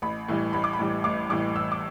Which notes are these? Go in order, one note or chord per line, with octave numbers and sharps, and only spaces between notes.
A1 B5
A2 E3 G3
A1 B5
D6
B5
A2 E3 G3
A1 D6
A2 E3 G3 D6
A1 E6
D6